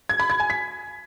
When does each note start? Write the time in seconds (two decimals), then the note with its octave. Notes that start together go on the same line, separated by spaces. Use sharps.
0.09 G#6
0.20 B5
0.30 G#6
0.40 G#5
0.50 B6